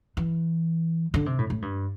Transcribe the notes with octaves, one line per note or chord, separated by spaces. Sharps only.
E3
D3
C3
A2
A2
G2